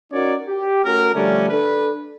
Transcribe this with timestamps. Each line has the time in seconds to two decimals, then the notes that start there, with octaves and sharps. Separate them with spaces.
0.12 C#4 D#4 F#4 A#4 C#5 D5
0.48 G4
0.85 A3 C#4 F#4 A#4
1.15 D3 F3 G3 A3 C#4 D4
1.49 D4 A4 B4